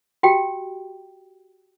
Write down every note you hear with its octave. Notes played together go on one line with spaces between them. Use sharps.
F#4 G4 G5